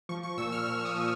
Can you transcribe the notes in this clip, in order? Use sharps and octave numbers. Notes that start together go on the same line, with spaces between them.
F3 C#6
C#6
A#2 E6
F6
A#2 E6
D#6
F3